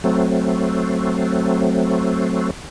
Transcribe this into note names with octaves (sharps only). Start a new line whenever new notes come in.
F#3 A3 C4